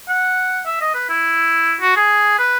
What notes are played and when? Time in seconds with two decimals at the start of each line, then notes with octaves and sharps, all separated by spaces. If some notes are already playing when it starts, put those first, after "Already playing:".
0.09 F#5
0.67 E5
0.81 D#5
0.95 B4
1.10 E4
1.81 F#4
1.97 G#4
2.39 B4